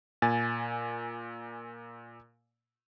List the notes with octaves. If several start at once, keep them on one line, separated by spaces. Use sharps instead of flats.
A#2 G#5 A6